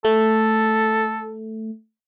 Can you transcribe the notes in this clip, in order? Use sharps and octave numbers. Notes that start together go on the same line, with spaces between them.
A3 A4